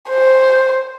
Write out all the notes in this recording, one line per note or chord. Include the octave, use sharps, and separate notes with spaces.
C5